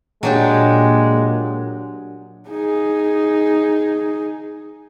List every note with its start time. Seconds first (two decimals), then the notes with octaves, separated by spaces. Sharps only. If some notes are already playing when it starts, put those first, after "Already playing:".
0.23 A#2 F#3 G#3 D4 G4
2.49 D#4 G#4